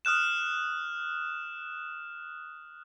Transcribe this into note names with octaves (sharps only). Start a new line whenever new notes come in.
D#6 F6 F#6 E7